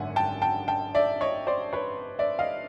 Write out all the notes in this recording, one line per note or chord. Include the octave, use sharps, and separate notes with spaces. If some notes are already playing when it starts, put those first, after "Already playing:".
Already playing: G#1 F#2 D3 E5 F#5 G#5
G5 A5
G5 A5
G5 A5
D5 E5
C#5 D#5
C5 D5
B4 C#5
D5 E5
D#5 F5